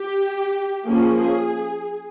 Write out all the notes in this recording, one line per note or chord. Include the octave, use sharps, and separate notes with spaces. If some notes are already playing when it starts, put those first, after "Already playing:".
Already playing: G4
F3 A#3 C#4 G#4